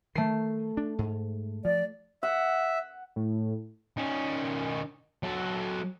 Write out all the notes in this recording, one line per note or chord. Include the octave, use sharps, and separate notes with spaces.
D#3 A3 C7
D4
G#2
F3 D5
E5 F#5
A2
D#3 C#4
F#3 A4